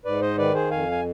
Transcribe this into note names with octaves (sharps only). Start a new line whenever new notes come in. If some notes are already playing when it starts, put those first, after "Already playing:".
G#2 B4 D5
C5 D#5
D#3 B4 D5
G#4 C5
F2 F5 G#5
G#5